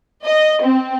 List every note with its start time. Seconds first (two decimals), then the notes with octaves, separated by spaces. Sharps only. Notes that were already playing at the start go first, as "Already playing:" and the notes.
0.23 D#5
0.59 C4